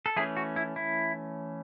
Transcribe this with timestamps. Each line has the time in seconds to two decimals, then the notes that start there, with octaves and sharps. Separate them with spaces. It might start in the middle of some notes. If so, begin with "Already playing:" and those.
0.06 A4
0.16 E3 A3 C#4 E4 G#4
0.37 F#4
0.56 E4
0.76 E4